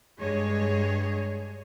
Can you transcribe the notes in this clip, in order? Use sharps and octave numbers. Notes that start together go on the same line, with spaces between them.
G2 G#3 G#4 C#5